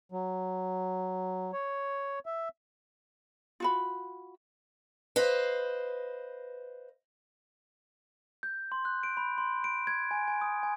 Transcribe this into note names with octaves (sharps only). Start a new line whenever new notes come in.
F#3
C#5
E5
F4 F#4 B5
B4 C5 D#5 F5
G6
C6
F#6
D7
B5
C6
D7
G#6
G#5
G#5
D#6
G#5